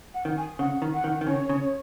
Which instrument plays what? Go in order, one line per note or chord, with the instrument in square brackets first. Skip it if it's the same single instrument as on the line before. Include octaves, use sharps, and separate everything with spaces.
[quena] F#5
[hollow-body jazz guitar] D#3
[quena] G#5
[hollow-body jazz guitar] C#3 [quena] F#5
[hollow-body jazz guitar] D#3
[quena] F#5
[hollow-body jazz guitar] D#3
D#3
[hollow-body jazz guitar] C#3 [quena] C#5
[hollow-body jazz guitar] C#3